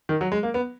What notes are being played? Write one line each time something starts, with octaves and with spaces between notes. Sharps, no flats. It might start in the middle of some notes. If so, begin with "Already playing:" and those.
D#3
F#3
G#3
A#3
B3